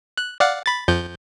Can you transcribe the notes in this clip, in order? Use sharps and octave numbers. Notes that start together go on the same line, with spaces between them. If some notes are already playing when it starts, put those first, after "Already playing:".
F#6
D5 F5 F#5
B5 A6
F2 F3 G6